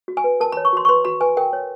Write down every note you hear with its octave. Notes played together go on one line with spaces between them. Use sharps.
F#4
G#5
B4
A#4 A5
B5
C#5
C#6
F#4 C6
C#6
B4 C6
F#4 B5
B4 G#5
A#4 G5
C#5